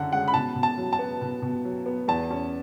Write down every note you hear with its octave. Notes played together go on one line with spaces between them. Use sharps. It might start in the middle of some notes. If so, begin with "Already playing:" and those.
Already playing: F#2 D3 C#4 F#5
G#3 F#5
B5
B2 A5
B2
A5
F#3
A5
B3
B2
B2
F#3
B3
E2 A5
C#4